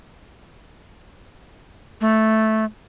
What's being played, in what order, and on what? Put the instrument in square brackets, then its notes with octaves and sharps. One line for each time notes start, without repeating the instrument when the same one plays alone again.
[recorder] A3